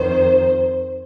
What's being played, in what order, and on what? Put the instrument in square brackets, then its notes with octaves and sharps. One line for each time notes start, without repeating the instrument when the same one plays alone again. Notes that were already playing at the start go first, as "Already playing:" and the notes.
Already playing: [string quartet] F2 D#3 C5